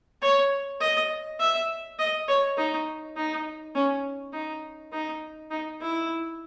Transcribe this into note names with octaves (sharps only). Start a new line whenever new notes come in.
C#5
D#5
E5
D#5
C#5
D#4
D#4
C#4
D#4
D#4
D#4
E4